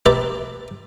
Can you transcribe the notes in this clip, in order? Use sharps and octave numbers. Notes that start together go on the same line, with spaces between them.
C4 G4 B4 E5 A5 A#5